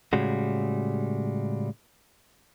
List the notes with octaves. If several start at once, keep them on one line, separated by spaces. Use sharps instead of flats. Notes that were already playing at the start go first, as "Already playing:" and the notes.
A2 C#3 G3 G#3 F#4